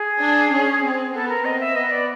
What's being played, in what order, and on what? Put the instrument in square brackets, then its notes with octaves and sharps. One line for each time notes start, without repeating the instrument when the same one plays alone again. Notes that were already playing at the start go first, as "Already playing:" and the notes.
Already playing: [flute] G#4
[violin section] D4
C#4
C4
[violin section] B3 [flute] A4
[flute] A#4
[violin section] C4 [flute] D#5
[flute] E5
[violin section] B3 [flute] D#5
[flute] D5